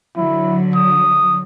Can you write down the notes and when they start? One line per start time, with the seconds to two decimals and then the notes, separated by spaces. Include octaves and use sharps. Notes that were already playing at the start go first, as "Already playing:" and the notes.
0.17 D3 F#3 E4
0.75 D#6